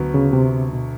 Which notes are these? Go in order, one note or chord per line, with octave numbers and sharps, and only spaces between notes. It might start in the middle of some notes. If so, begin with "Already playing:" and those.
Already playing: D2 D3 F#3 B3
C#3
C3
B2